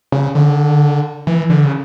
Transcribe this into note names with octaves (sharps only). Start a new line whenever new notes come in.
C#3
D3
E3
D3
C#3